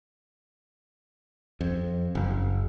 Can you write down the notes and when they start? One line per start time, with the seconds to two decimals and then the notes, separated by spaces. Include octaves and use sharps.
1.61 F2
2.15 F#1